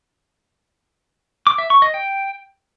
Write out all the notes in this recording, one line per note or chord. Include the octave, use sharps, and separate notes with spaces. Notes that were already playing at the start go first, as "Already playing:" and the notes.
D6
E5
C#6
D#5
G5